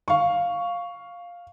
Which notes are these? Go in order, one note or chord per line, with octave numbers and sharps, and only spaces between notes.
F5 C#6